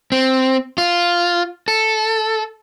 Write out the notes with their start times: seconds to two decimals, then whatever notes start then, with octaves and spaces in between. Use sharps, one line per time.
0.12 C4
0.78 F4
1.68 A4